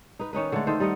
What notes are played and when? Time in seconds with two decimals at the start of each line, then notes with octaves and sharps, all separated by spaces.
0.19 D#4 B4
0.33 D#3 C#4 D#4 B4
0.52 D3 G#3 A3
0.67 D#3 A4 C5
0.80 G3 D#4 D#5 F#5